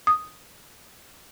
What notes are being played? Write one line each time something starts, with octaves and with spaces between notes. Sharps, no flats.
D#6